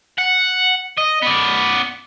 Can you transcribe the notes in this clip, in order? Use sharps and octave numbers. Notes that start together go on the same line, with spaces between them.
F#5
D#5
B3 D5